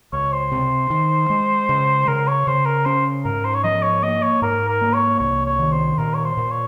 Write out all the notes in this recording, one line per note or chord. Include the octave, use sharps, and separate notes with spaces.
C#2 C#5
C5
C3
D#3
G#3
C#3
C#3 A#4
C#5
C#3 C5
A#4
C#4 C5
G#2 A#4
C5
C#5
F3 D#5
C#5
A#3 D#5
C#5
G#2 A#4
A#4
A#3
C#5
C2 C#5
C#5
D#3
C5
A#2 A#4
C#5
C5
A#2
C#5